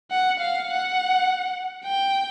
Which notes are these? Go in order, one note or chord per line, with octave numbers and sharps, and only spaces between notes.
F#5
F5
F#5
G5